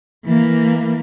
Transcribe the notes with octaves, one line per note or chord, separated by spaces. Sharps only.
E3 A#3